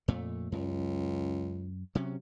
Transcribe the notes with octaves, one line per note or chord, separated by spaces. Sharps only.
F2 A#2 A3
C#2 F#2
C3 F#3 C#4